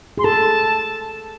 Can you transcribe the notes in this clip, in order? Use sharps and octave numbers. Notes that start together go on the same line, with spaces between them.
G#4 C6
A4 A5